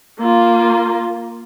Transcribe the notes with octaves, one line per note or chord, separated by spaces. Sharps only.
A#3 F4